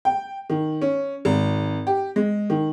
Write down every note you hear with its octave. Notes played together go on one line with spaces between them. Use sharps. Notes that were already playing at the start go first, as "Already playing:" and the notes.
G5
D#3
C#4
G#1
G4
G#3
D#3